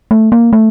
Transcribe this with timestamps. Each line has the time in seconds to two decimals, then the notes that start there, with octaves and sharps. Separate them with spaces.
0.11 A3
0.32 A#3
0.53 A3